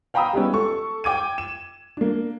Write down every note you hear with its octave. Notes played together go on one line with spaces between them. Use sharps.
F5 G5 A#5 B5 D#6 E6
G3 G#3 B3 C#4
A4 C#6
G5 D6 G#6 D#7
E7
A#3 D4